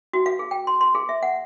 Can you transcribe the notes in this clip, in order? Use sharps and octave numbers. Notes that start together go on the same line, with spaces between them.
F#4
F5
G#4
G5
C6
C6
G#4
E5
F#5